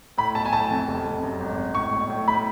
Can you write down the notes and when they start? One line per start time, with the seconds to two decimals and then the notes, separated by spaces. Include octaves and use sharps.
0.18 A2 B5
0.35 B1 A5
0.45 G#5
0.53 A2 A5
0.71 F2
0.88 F1
1.05 F1
1.23 F#2
1.40 G#1
1.57 G#1
1.75 A2 C#6
1.93 B1
2.10 A2
2.27 A2 B5